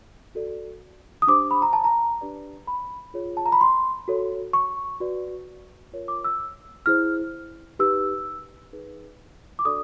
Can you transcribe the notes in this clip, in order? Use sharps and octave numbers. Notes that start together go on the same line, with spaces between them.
F#4 A4 D5
D#6
D4 G4 C5 D6
B5
A#5
A5
A#5
D4 G4 B4 D5
B5
F4 G#4 C#5
A5
A#5
B5
C6
F#4 A4 C#5
C#6
F#4 B4 D5
F4 A#4 C#5
D6
E6
E4 G#4 C5 F6
D#4 G4 B4 E6
D#4 G#4 B4
D6
D4 F#4 A4 D5 D#6